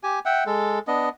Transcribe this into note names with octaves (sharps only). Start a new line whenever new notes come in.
G4 G#5
E5 F#5 G5
G#3 A4
B3 D4 D#5